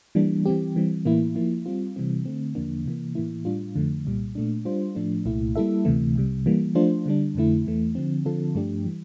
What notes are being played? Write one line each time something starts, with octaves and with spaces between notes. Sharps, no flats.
E3 G3 A#3 D4
E3 G3 C4 G4
E3 G3 C4
A2 E3 A#3 E4
F3 A#3 E4
G3 C4 F4
C3 E3 G3 C4
D3 A3 C4
E2 D3 F3 A#3 D4
C3 E3 A#3
A2 E3 A#3 E4
A2 G3 D4 F4
F2 D3 F3 A3
C2 A#2 G3
A#2 A3 D4
G3 D4 F4 C5
A2 F3 A3 D4
C2 A#2 A3 E4
G3 A#3 E4 A4 E5
D2 C3 E3 A3
C2 C3 G3
E3 G3 A#3
F3 A3 D4 F4 C5
D3 G3 D4
F2 D3 A3 E4
E2 E3 A3
D3 F3 C4
D3 F3 C4 F4 A4
G2 F3 A3 D4 G4
E3 G3